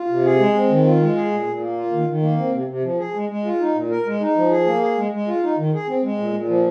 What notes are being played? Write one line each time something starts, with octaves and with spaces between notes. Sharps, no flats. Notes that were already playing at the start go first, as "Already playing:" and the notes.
Already playing: F4
C3
G#4
G#3
C4
D#3
F4
G#3
G#4
A#2
A#2
A#3
F4
D#3
D#3
A#3
C4
C3
C3
F3
G#4
G#3
G#3
F4
D#4
A#2
A#4
G#3
D#4
F3
G#4
A#3
G#4
G#3
G#3
F4
D#4
D#3
G#4
C4
G#3
A#2
A#2
F3